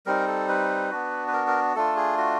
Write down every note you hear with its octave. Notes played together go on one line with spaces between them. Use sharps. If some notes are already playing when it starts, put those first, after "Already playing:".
G3 C4 D#4 A#4
A4
B4
B3 D4 F#4
B4
A#4
A#4
A3 D4 F4 A4
G#4
F#4